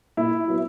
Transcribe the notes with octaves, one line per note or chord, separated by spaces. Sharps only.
A#2 E4
F#3 B3